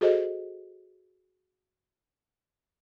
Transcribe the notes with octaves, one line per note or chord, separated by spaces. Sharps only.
F#4 G#4 A4 C5 D#5